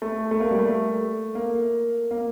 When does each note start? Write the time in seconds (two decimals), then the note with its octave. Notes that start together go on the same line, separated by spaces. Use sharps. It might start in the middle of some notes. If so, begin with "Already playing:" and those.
0.02 A3
0.31 A3
0.40 A#3
0.51 G3
0.59 A3
1.35 A#3
2.11 A#3